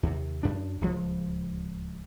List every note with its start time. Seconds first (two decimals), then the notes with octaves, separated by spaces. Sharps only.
0.03 D#2 C3
0.43 F#2 D4
0.81 D1 C#2 F3